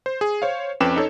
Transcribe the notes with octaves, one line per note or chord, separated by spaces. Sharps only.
C5
G#4
C5 C#5 F5
F2 C#4 B4 G5 D6 E7
D#4 A4 C#5